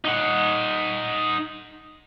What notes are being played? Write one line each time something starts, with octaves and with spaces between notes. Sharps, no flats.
D#4 F#5